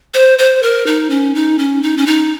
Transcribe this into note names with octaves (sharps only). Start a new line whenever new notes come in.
C5
C5
A#4
D#4
C#4
D#4
C#4
D#4
C#4
D#4